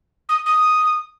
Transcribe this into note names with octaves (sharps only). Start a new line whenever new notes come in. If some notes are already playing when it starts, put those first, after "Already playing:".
D#6
D#6